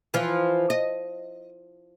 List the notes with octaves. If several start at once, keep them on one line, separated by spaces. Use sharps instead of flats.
E3 F3
D#5